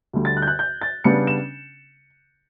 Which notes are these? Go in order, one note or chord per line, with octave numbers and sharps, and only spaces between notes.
D2 D3 G3
A6
F#6
G6
F#6
G6
A6
C#3 G3 B3 D4 C#7
E7